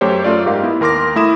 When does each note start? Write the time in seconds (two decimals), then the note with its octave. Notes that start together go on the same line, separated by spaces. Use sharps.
0.01 F#2 A3 G4 C5 C#5
0.24 F#2 A3 F4 D5
0.46 G#2 G4 A#4 F5
0.63 B3 E4
0.81 D#2 A#4 C6 D6 A#6
1.16 A3 E4 D#6 E7